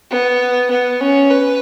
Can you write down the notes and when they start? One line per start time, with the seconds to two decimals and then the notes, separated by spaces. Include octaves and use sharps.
0.11 B3
0.71 B3
1.01 C#4
1.31 B4